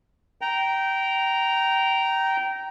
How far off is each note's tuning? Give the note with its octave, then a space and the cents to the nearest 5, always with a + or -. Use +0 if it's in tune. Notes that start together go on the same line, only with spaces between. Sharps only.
G5 -20 A#5 +0